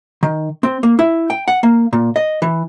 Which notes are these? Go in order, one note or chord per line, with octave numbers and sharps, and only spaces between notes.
D#3
C4
A#3
E4
G5
F#5
A#3
A#2
D#5
E3